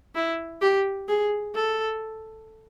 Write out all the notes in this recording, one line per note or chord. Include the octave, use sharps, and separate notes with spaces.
E4
G4
G#4
A4